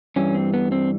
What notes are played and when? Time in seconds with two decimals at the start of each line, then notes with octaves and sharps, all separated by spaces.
0.16 G2 E3 G3 C#4
0.34 C4
0.54 B3
0.72 C4